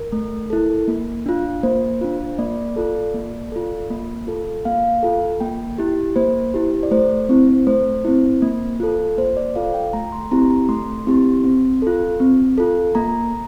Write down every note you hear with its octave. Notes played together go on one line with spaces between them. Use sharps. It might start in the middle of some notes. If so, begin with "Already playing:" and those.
Already playing: A#4
A3
E4 A4
A#3
D4 F4
A#3 C5
D4 F4
A#3 D5
F4 A4
A#3
F4 A4
A#3
F4 A4
A#3 F5
F4 A4
A#3 G5
E4 G4
A#3 C5
E4 G4
D5
A3 C5
C4 E4
A3 C5
C4 E4
A#3
F4 A4
A#3 C5
D5
F4 A4 F5
G5
A3 A#5
C6
C4 E4 G4 A#5
A#5
A3 C6
C4 E4 G4
C4
F4 A4
C4
F4 A4
A#3 A#5